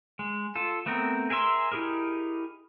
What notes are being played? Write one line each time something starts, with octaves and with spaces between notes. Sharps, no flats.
G#3
F4 A4
A3 B3 C4 A#4
G#4 A#4 E5 C6
D#4 E4 G4 G#4 A#4